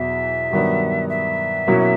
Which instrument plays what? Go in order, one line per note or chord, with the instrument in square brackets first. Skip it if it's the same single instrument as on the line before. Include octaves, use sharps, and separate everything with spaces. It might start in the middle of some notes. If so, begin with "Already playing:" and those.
Already playing: [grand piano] E2 B2 F#3 B3 [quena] E5
[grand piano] G2 D#3 F#3 B3 D4
[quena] E5
[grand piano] B2 F#3 A#3 C#4 E4